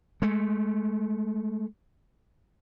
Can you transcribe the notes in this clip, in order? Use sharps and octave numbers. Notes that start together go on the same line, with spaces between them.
G#3 A3